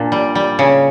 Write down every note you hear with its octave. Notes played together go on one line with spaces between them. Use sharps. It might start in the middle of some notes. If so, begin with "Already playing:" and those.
Already playing: A#2 D4
G3
G3
C#3